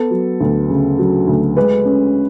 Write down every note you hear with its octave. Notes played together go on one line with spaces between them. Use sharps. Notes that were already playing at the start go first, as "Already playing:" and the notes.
Already playing: B3 A4
F#3
D2
C#3
F#3
D2
G#3 B4
C#4